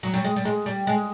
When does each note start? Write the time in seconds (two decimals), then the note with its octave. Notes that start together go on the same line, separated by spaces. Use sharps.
0.03 F#3
0.14 G3
0.24 G#3
0.36 G3
0.45 G#3
0.66 G3
0.87 G#3